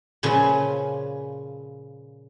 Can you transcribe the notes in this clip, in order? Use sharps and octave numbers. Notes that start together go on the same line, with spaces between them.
A#2 C#3 F3 B4 G#5